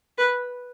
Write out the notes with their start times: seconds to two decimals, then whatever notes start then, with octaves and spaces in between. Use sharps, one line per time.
0.18 B4